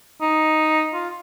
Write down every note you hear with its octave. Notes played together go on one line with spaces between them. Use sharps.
D#4
F4